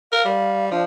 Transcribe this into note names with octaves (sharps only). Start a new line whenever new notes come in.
A#4 F5
G3
F3 D4